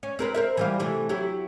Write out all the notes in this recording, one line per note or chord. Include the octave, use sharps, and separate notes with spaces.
C#4
C4 A#4 B4
C4 A#4 E5
E3 G3 F4
C3 E3 A3
F#3 E4 G4